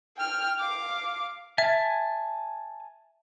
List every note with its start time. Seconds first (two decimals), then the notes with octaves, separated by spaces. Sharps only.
0.17 G5 F6
0.59 F5 D6
1.58 E5 G#5 A5